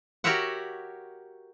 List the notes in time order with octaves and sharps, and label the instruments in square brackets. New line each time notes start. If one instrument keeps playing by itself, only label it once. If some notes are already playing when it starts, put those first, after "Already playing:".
[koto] F#4 G4 A#4 C#5 E5 F#5